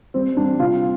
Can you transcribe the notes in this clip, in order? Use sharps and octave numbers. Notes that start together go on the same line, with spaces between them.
G3 C4
G3 D4
C3 F4